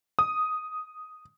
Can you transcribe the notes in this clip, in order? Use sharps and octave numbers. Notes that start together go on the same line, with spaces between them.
D#6